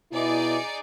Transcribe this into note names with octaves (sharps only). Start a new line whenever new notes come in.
B2 D#4 E4 G#4 D5